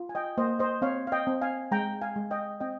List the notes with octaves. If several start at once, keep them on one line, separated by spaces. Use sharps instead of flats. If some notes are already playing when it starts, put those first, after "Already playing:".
Already playing: F4
G#5
D#5 G5
A#3 C5 D#5
C5 D#5
C4 C#5 F5
F5
D#5 G5
C4
F5 G#5
G#3 G5 A#5
F5 G#5
G#3
D#5 G5
C4 D#5 G5